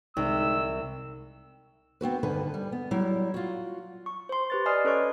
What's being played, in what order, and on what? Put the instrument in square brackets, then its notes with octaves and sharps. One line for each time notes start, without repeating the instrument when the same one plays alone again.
[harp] C2 [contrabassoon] G#2 [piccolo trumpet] E6
[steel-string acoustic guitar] B3 C4 F#4 B4
D2 G2 D3 D#3 B4 G#5
G3
B3
F#3 G3 E4
F4 F#4
[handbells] C#6
C5 C6
G4 B4 A6
D5 D#5 G#5 D#6 F6 C7
C#4 A4 B4 C#5 C#6